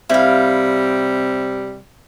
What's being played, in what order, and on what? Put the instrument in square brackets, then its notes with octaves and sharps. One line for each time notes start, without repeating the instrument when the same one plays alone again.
[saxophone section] C3 G3 C4 [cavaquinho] E4 F5